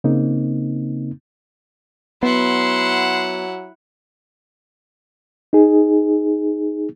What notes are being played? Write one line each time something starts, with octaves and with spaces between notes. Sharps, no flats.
C#3 A#3 C4 D#4
F#3 B3 E4 F#5 C6
D#4 G#4